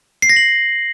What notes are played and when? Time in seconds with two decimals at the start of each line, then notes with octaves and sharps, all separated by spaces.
0.22 C7
0.29 A#6
0.37 F#7